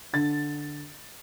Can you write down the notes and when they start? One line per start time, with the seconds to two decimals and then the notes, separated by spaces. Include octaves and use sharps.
0.13 D3 A6